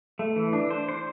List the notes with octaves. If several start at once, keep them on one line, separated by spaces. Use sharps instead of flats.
A3
E3
D4
C5
C5